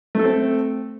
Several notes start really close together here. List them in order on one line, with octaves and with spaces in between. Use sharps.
A3 A4 C4